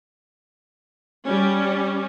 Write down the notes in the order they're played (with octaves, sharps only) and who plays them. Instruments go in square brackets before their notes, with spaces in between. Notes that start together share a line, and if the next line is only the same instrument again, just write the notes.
[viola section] G3 C#4